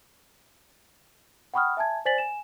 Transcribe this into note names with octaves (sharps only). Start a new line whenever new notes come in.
F#5 G5 B5 C#6 D#6 F6
E5 G#5 A5 G#6
C5 D5 G#5 A6 B6 F#7
G#5 E7